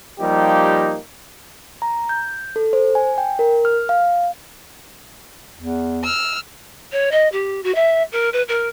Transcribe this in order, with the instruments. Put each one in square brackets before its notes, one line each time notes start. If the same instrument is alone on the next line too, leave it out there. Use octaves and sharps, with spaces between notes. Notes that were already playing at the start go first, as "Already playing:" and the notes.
[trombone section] F3 G3 A#3 D#4 G4
[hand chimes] A#5
G6
A4
C5
G#5
G5
A#4
F6
F5
[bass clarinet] E2
[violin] E6 F6
[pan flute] C#5
D#5
G4
F#4
E5
A#4
B4
A#4